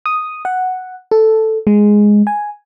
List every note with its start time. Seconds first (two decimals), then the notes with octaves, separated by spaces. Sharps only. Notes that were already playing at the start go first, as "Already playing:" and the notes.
0.06 D#6
0.45 F#5
1.11 A4
1.67 G#3
2.27 G#5